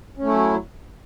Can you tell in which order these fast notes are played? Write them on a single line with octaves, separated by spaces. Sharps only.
C#4 A3 E4 F#3